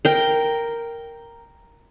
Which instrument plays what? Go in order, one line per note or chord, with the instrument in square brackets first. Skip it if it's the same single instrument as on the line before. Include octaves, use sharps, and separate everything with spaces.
[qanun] A#4 G5